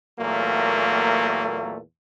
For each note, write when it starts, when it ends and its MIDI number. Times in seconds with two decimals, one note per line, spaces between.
0.20 1.79 40
0.20 1.79 46
0.20 1.79 54
0.20 1.79 57
0.20 1.79 58